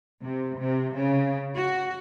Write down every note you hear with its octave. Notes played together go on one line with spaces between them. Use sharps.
C3
C3
C#3
F#4